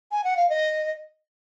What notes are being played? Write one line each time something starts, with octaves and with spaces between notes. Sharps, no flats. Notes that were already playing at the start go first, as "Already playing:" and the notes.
G#5
F#5
F5
D#5